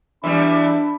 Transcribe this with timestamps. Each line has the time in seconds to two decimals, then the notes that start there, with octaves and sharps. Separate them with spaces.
0.24 E2 G3 D4 E5 B5